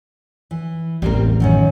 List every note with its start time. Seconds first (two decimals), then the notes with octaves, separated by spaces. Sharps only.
0.51 E3
1.02 A1 E2 G3 C4 A#4
1.40 F#2 D#3 C#4